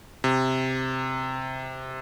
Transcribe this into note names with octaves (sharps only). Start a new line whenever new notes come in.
C3